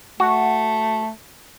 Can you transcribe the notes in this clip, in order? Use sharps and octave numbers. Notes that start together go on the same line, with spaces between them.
A3 F#4